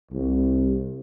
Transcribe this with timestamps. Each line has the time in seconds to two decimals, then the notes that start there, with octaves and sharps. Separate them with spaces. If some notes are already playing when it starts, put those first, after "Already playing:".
0.10 C2